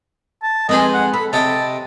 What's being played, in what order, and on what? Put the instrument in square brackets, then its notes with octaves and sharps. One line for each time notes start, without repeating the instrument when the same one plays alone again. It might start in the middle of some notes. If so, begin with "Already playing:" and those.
[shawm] A5
[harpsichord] F2 B4 C5 [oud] G#3 D#4 G#4 [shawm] D#5
[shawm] F#5
[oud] A4 [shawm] B5
[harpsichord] C3 D#5 G5 [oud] C#5 [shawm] A5